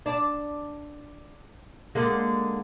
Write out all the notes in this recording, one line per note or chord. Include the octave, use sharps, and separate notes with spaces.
D4
D3 G#3 A#3